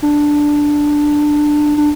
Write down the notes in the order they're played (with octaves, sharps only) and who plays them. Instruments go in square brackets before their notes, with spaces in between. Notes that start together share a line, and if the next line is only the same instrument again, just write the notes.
[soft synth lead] D4
D4